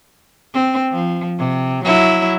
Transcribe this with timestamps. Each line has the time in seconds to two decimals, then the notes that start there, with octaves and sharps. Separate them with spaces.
0.54 C4
0.92 F3
1.38 C3
1.85 F#3 E4